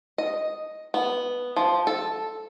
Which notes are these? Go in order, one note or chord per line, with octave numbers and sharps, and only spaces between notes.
D#5
B3
F3
A4